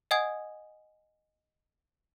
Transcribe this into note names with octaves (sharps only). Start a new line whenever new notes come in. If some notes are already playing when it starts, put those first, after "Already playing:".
D#5 F#5 G#5 D#6 G#6